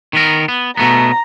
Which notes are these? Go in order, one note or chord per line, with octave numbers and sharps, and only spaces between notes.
D#3 B3 A#4
B3
B2 A3 B3 A#5